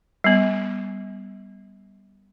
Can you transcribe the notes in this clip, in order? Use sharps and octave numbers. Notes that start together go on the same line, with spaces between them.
G3 B3